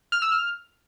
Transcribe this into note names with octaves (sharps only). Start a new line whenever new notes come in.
F6
E6
F6